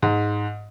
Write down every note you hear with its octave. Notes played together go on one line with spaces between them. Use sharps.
G#2